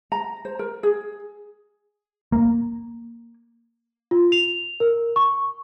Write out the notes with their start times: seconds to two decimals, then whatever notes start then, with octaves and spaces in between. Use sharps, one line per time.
0.12 A#5
0.45 C5
0.59 A#4
0.83 G#4
2.32 A#3
4.11 F4
4.32 F7
4.80 A#4
5.16 C#6